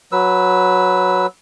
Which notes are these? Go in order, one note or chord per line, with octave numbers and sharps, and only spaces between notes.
F#3 B4 E6